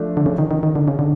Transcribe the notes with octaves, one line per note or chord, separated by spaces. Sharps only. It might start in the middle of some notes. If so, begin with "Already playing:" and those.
Already playing: F3 A3 D4
D3
C#3
D#3
D#3
D#3
D3
C#3
D3